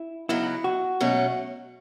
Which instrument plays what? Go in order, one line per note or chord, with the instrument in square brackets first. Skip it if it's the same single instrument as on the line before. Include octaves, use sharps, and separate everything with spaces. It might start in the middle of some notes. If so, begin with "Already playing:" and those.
Already playing: [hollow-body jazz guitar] E4
[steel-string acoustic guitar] C#3 F#3 B3 D#4 [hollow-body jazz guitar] E4
[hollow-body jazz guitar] F#4
[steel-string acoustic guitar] B2 F#3 A3 C#4